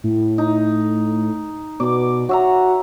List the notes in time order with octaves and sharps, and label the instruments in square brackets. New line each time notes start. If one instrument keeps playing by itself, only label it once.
[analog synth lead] A2
[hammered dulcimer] D#4
[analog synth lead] B2 [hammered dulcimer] D5 D6
[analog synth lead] F#4 [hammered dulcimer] C#5 E5 A#5